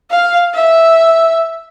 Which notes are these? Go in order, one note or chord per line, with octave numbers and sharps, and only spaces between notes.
F5
E5